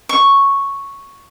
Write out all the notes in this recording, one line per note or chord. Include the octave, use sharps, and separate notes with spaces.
C#6